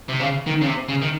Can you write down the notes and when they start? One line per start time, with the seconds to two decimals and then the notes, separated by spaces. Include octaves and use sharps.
0.09 C3
0.20 C#3
0.47 D#3
0.62 C#3
0.67 C3
0.89 C#3
1.02 D#3